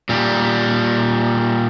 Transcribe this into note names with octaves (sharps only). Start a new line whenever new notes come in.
A#2 G3